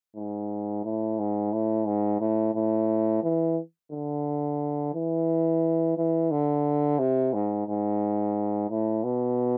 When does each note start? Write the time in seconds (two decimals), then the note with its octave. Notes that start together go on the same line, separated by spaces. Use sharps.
0.16 G#2
0.84 A2
1.19 G#2
1.52 A2
1.86 G#2
2.21 A2
2.55 A2
3.23 E3
3.92 D3
4.94 E3
5.97 E3
6.31 D3
6.99 C3
7.34 G#2
7.67 G#2
8.70 A2
9.04 B2